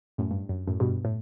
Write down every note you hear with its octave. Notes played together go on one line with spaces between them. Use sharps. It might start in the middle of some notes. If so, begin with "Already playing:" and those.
F#2 A2
G2
F#2
F#2 A2
G2 B2
A2